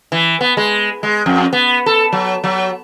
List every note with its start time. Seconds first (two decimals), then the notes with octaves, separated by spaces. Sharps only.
0.12 E3
0.41 B3
0.57 G#3
1.03 G#3
1.26 F2
1.53 B3
1.86 A4
2.12 F#3
2.44 F#3